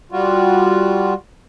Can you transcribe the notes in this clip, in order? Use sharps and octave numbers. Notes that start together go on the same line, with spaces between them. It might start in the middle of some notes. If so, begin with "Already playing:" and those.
G3 F4 F#4